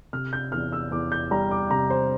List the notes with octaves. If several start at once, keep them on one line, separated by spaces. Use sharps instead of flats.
C3 F6
G6
E2 F6
E6
E2 D6
G6
G3 A#5
D6
C3 A#5
C5